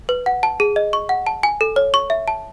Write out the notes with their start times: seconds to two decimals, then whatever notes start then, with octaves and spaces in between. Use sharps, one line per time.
0.09 B4
0.26 F#5
0.43 A5
0.60 G#4
0.76 D#5
0.93 C#6
1.09 F#5
1.26 A5
1.43 G#5
1.61 A4
1.76 C#5
1.94 C#6
2.10 E5
2.28 A5